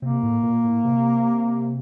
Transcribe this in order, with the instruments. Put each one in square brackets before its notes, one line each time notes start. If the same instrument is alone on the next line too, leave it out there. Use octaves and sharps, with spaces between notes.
[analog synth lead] C3 [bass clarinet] A#3
[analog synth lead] A2
A#2
A2
C3